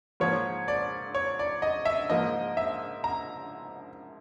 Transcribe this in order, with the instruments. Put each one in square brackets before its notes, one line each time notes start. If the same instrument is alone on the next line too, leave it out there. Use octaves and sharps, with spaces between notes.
[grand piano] G#2 F3 A#3 C#5
D5
C#5
D5
D#5
E5
G#2 F3 A#3 D#5
E5
A#5